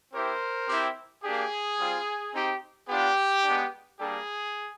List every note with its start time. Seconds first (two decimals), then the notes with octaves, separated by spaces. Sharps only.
0.12 C4 E4 G4 A#4 C5
0.68 C4 E4 G4
1.23 A#3 D4 G4 G#4
1.78 G3 C4 F4
2.33 C4 D#4 G4
2.88 B3 D4 F4 G4
3.43 G#3 B3 D4
3.98 G3 A#3 D4 G4 G#4